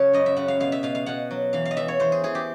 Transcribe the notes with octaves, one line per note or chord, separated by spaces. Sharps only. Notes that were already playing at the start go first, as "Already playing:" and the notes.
Already playing: C#3 F#3 C#5
F#2 D#5
E5
C#3 F#5
F5
B2 F5
E5
B2 F5
F5
B2 F#5
F#3
E3 F5
F5
D#5
E3 E5
C#5
E2 C5
G#4
E3 G#4
G4